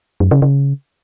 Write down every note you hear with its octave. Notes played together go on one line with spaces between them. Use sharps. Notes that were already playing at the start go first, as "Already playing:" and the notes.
F#2
C#3
C#3